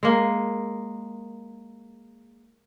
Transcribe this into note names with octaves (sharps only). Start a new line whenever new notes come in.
G#3 A#3